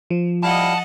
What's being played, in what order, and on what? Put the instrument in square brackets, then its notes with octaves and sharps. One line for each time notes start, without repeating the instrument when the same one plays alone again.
[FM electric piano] F3
[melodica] G3 E4 F5 [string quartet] D#5 F#5 [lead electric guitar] A5